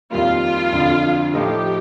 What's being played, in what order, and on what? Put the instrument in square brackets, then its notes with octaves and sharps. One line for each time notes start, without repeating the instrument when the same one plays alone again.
[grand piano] F2 D#3 G3 A#3 [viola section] F4
[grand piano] F2 D3 F3
[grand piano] A2 F3 A3 D#4 [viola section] G4